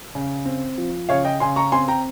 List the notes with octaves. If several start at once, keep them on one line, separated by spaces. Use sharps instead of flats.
C#3
C4
F3
C#3 C#5 F5
D#5 G5
C#3 G#5 C6
A#5 C#6
C4 G#5 C6
G5 A#5